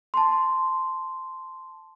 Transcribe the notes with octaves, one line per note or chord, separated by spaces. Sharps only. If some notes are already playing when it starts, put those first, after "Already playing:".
A5 C6